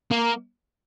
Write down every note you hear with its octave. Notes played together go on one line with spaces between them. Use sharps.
A#3